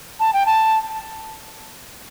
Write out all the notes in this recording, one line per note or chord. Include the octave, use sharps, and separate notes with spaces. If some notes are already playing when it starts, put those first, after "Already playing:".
A5
G5
A5